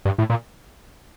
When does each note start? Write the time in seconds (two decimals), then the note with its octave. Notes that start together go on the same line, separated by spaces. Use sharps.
0.05 G2
0.18 A2
0.30 A#2